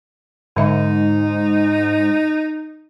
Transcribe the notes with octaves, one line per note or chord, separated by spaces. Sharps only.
G#2 D3 D#4 E5